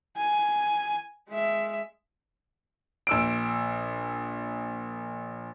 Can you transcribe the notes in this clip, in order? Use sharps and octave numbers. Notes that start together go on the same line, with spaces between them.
G#5
G#3 E5
A#1 E6 D7